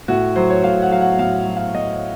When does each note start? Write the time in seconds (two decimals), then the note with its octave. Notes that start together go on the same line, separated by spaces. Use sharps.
0.08 A2 F#4
0.36 F#3 C5
0.50 C#5
0.64 A2 F5
0.82 F#5
0.92 F#3 F5
1.01 F#5
1.19 A2 F5
1.47 F#3
1.57 F5
1.74 A2 D#5